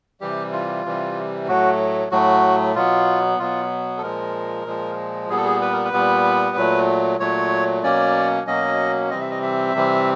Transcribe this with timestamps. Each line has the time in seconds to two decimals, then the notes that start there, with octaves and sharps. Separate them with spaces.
0.21 C3 E3 G3 G4
0.53 F4
0.85 C3 E3 G3
1.48 A2 F#3 A3 F#4
2.11 A2 F#3 A3 F#4
2.75 B2 F#3 B3 F4
3.38 B2 F#3 B3 F4
3.97 A4
4.02 A#2 F3 G#3 A#4
4.65 A#2 F3 G#3
5.29 A#2 G3 B3 G#4
5.37 A4
5.45 G#4
5.62 B4
5.73 A#4
5.85 B4
5.93 A#2 G3 B3
6.56 A#2 F#3 A3
7.20 A#2 F#3 A3 C#5
7.83 B2 F#3 A#3 C#4 D5
8.47 B2 F#3 A#3 C#4 D#5
9.10 C3 E3 G3 C4 D#5
9.21 E5
9.31 D#5
9.42 E5
9.74 C3 E3 G3 C4